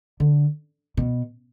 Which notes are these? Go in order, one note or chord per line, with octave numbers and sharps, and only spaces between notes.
D3
B2